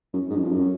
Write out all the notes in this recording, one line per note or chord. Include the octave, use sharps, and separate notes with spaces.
F#2
G#2
F#2
F2
F#2